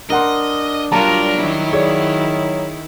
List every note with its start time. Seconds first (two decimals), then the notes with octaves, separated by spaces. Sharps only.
0.10 D4 A#4 D#5 F#5 C6
0.92 F#3 G3 F4 A#4 A5 A#5
1.38 D#3 E4
1.73 G#4 C#5 D5
2.26 F#3